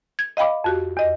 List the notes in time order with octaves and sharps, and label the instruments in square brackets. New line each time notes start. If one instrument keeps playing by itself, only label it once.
[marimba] G#6
D#5 F5 G5 B5 D6
F2 F#4 G4
E2 D#5